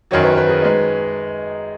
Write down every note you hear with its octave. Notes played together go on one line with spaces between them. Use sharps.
F#2 D#3 F#3 C#5
B4
B4
G#4
G#3 D#4